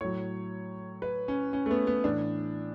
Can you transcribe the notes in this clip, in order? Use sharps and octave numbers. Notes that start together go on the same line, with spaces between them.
A2 F#3 C#5
B4
C#4
C#4
A3
B3
B3
A2 E3 D4